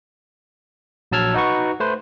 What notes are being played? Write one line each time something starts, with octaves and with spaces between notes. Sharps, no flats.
A#1 F#3 A5 E6 F6 G#6
D#4 F#4 B4 C#6
A3 B4 C5